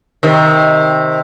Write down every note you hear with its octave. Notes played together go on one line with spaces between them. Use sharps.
C3 D#3